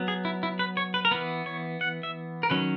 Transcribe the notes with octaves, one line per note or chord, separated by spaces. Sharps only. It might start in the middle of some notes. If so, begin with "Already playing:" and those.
Already playing: F#3 B3
G#4
E4
E4
B4
C#5
B4
A#4
E3 B3 B4
C#5
F#5
E5
A#4
D#3 F#3 C#4 B4